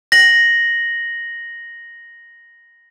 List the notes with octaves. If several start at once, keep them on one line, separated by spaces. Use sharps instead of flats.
A#6 F#7